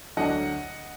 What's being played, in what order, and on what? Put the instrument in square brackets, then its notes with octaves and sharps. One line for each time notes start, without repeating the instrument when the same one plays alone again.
[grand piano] D2 D3 F#3 D4 D#5 F#5